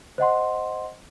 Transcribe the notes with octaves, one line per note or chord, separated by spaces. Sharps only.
C5 D#5 F#5 C6